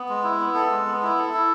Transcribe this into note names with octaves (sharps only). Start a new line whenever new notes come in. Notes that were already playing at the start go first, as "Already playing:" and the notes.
Already playing: B3
G#3
E4
B3
A4
G#3
B3
E4
A4
E4